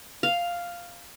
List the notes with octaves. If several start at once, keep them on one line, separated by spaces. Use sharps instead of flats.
F5